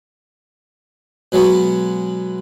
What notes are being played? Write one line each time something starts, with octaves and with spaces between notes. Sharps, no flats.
B2 F#3 G#3 B3